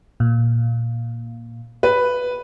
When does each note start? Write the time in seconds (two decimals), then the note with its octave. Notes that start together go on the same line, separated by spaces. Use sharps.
0.20 A#2
1.83 B4